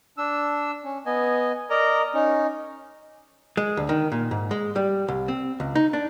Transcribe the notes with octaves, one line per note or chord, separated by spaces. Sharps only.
D4 E6
C#4
B3 D#5 G#5
A#4 D5 D#5 A#5
C#4 D#4
G#3
D2
D#3
A#2
G#2
G#3
G3
C2
C4
C#2
D#4
D4